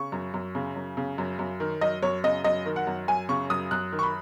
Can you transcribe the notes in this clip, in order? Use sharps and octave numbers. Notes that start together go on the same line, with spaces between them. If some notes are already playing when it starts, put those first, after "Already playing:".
Already playing: C#3 C#6
F#2
F#2
C#3
F#2
C#3
F#2
F#2
D#3
F#2 D#5
F#2 C#5
C#3 D#5
F#2 D#5
D#3
F#5
F#2
F#2 G#5
C#3 C#6
F#2 D#6
F#2 F#6
D#3
C#6
B5